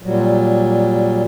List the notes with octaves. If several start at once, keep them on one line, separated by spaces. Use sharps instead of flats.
A#2 F#3 G3